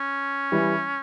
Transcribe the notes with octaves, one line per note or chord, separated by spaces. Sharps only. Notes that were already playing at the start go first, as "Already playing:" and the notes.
Already playing: C#4
E3 G3